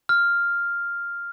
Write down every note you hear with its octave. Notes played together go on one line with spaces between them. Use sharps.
F6